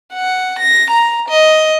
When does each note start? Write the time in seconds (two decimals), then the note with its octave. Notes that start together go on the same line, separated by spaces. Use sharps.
0.13 F#5
0.59 A#6
0.90 A#5
1.29 D#5